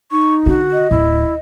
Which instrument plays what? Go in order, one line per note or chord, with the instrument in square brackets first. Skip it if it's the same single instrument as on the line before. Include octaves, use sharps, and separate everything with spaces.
[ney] D#4 [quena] C#6
[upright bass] D3 D4 [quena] F#4
[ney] D#5
[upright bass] D1 [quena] E4